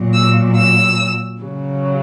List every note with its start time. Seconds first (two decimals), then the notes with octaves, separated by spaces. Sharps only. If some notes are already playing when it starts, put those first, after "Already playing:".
Already playing: A#2 F#3
0.13 E6
0.56 E6
1.40 C#3 F#3